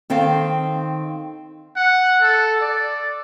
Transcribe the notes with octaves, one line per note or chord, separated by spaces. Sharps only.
D#3 C4 A4 F5
F#5
A4
D5